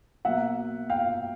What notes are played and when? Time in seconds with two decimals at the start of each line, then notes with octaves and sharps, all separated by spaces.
0.25 B2 F#3 A#3 E5 F#5
0.90 F5 G5